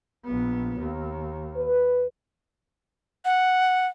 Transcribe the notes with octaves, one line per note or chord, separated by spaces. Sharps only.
A#1 B3
D#2
B4
F#5